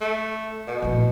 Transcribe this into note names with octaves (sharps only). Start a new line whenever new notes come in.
A3
B2
A#1 A2